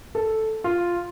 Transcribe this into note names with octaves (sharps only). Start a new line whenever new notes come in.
A4
F4